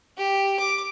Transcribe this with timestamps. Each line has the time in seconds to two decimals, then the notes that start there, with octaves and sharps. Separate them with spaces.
0.18 G4
0.59 D6